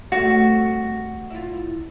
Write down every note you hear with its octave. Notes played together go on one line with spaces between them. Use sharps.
G3 A3 C4 F#4
E4 F4